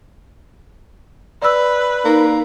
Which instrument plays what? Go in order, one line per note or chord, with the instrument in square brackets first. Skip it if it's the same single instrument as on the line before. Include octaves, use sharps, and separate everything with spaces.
[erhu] B4 [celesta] D5 E6
[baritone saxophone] A#3 [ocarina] D#4